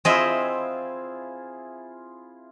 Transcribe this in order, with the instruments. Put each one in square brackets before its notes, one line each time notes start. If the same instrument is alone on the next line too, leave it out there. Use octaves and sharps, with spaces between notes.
[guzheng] C4 D#5 E5 [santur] E4 F4 G#4